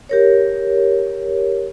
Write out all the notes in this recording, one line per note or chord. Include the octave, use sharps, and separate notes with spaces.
G4 A#4 C#5